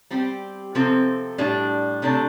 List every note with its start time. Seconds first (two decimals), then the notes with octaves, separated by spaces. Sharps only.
0.10 G3 C4 G4
0.75 C3 F3 C4 A4
1.38 A2 G3 D4
2.02 C3 A3 D4 A4